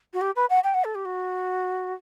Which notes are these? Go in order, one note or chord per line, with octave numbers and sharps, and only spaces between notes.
F#4
G4
B4
F#5
G5
F#5
A4
G4
F#4